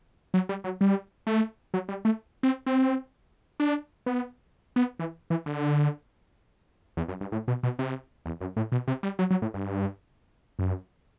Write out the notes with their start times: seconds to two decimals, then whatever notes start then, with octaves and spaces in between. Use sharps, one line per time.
0.34 F#3
0.49 G3
0.64 F#3
0.81 G3
1.27 A3
1.74 F#3
1.89 G3
2.05 A3
2.43 C4
2.67 C4
3.60 D4
4.06 B3
4.76 B3
4.99 E3
5.30 E3
5.46 D3
6.97 E2
7.08 F#2
7.21 G2
7.32 A2
7.48 B2
7.63 B2
7.79 C3
8.26 E2
8.41 F#2
8.57 A2
8.72 B2
8.88 C3
9.03 G3
9.19 F#3
9.31 F#3
9.42 A2
9.54 G2
10.59 F#2